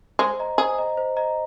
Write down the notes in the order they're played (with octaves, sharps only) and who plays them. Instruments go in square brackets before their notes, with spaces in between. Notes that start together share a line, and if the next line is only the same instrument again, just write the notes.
[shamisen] G#3 [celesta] C5
[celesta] D#5 A#5
[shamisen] G#4 [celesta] C5
[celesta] D#5 A#5
C5
D#5 A#5